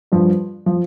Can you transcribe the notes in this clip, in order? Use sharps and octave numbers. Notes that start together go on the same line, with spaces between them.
G2 F3
F3